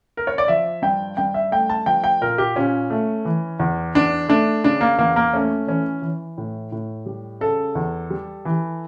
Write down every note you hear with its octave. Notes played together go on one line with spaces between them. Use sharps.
A#4
C#5
D5
F3 E5
G2 G5
G2 G5
E5
A3 G5
A5
F3 G5
G5
A#2 A#4
G4
A#2 C#4
A3
E3
E2
E2 D4
A3 D4
C#3 D4
A#3
E2 A#3
A#3
A3 C#4
E3 C#4
E3
A2
A2
G3
C#3 A4
E2
G3
E3